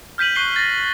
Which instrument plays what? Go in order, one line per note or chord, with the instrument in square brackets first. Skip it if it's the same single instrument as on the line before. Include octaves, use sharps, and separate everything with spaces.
[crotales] F6 G6 B6 D#7 F#7
C#6 F#6 C7 D#7 G7
G6 A6 A#6